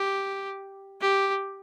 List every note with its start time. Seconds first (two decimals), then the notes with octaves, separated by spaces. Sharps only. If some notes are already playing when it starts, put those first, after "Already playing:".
Already playing: G4
1.01 G4